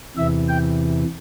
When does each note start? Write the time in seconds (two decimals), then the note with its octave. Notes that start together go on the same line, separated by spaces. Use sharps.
0.16 E2 C3 E3 E5
0.49 G5